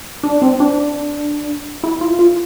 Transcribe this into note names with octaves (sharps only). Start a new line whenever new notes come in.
D4
C4
D4
E4
F4
F4